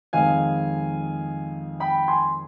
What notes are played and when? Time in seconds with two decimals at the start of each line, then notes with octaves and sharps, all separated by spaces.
0.13 F2 D#3 G#3 F5 G#5
1.80 G5 B5
2.08 G#5 C6